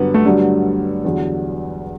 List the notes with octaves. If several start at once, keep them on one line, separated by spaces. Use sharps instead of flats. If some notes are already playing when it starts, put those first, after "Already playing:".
Already playing: G2 D3 F#3 B3
A3
G2 D3 F#3 G3
E2 D3 F#3